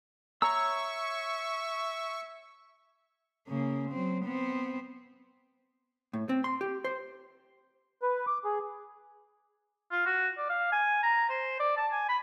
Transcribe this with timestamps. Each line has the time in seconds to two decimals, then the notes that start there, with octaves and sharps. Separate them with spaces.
0.42 C#5 E5 A#5 C#6 E6
3.48 C#3 A#3
3.91 F#3 C4
4.25 B3 C4
6.13 A2
6.29 C4
6.44 C6
6.61 G4
6.84 C5
8.02 B4
8.27 D6
8.45 G#4
9.91 F4
10.06 F#4
10.38 D5
10.49 F5
10.72 G#5
11.03 A#5
11.29 C5
11.59 D5
11.77 A5
11.92 G#5
12.09 B5